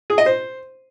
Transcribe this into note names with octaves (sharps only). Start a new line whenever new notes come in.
G#4
D#5
C5